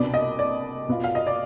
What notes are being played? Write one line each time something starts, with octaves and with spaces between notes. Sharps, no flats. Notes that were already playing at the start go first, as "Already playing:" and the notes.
Already playing: C2 B2 B3 D4 D5
D#5
D5
B2 B3 F4
F5
D#5
D5